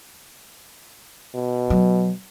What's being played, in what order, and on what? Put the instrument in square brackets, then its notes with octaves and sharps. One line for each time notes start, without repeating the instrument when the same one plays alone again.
[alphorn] B2
[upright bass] F#3